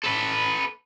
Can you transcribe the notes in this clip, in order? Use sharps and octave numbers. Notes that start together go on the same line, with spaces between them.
A4 B4